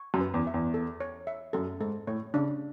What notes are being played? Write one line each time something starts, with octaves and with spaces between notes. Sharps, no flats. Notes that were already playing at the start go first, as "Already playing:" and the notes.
Already playing: C#6
F#2
B4
E2
E5
E2
A4
C#5
E5
F#2 A4
G#2 A4
A2 C#5
C#3 D4